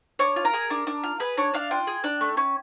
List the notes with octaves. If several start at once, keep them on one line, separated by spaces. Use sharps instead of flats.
D4 C#5
F4
A#4
G#4
D4
D4
F4
G#4 B4
D4 C#5
D4 F5
F4 G5
G#4
D4
A3
C#4